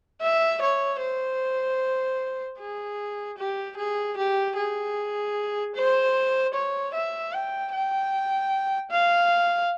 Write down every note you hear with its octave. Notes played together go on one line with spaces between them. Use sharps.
E5
C#5
C5
G#4
G4
G#4
G4
G#4
C5
C#5
E5
G5
G5
F5